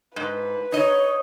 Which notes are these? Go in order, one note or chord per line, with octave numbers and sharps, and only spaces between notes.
G#2 B4
D#4 C#5 D#5